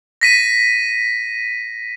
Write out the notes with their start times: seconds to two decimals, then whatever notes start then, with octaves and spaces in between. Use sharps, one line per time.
0.21 A#6 B6 D#7